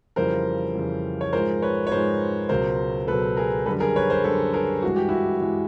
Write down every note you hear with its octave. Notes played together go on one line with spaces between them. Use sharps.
F2 C#3 E3 G3 A#4 C5
F2 C#3 E3 G3
C#5
G#2 F3 G#3 A#4 C5
B4 C#5
C#5
G#2 F3 G#3 A#4 C5
C#2 B2 F#3 A#4 C5
C#2 B2 F#3 A4 B4
G#4 A#4
F#2 D3 G3 A4 B4
G#4 A#4
B4 C#5
A#4 C5
F#2 D3 G3 A4 B4
G#4 A#4
G2 E3 G#3 F#4
G4
E4 F#4
G2 E3 G#3